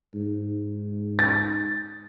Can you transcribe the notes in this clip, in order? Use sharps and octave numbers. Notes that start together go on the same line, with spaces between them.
G#2
A6